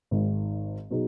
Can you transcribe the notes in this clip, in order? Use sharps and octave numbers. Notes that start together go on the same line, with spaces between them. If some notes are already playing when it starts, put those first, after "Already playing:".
G#1 G#2 D#3
B2 F#3 B3 D#4 G#4